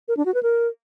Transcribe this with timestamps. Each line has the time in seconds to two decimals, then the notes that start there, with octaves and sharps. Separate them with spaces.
0.08 A#4
0.17 D4
0.26 F#4
0.34 B4
0.43 A#4